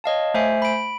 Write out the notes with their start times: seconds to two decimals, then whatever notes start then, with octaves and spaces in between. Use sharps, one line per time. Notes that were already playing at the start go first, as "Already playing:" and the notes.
0.04 C#5 D#5 F5 A5
0.34 A3 C5 E5 G#5 C7
0.62 B5 D7